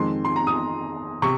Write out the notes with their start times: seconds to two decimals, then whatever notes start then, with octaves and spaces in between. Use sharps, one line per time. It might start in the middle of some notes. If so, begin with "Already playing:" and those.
Already playing: F2 D#3 G#3 C4 C6
0.25 C6
0.36 A#5
0.47 D#6
1.22 C3 C#6